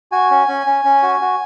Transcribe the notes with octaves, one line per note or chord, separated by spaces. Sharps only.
F#4 G#5
C#4
C#4
C#4
C#4
F#4
F#4